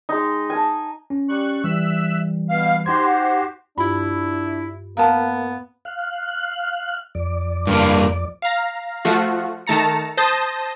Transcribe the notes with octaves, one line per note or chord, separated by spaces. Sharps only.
G#3 D#4
G#5 A5
C#4
G3 C#6 F#6
E3 G3 E5 E6 F#6
B2 F5
D#4 F#4 G4 C5 C6 G#6
F#5
G2 D4 E4 F4 B5
A#3 B3 A#4 F5 A5 A#5
F5 F#6
F2 D5
G2 A#3
F5 A#5
F3 A3 F4 F#4
D#3 A3 A5 A#5 C#7
C5 A5 D#6 G6 A#6